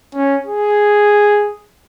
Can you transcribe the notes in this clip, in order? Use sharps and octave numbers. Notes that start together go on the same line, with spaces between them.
C#4
G#4